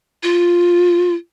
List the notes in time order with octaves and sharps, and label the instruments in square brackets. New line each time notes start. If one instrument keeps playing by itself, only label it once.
[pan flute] F4